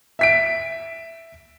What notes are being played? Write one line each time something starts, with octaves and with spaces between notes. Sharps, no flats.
E5 B6 D7